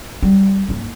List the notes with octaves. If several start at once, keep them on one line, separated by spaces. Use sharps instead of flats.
G3
D#2 G#2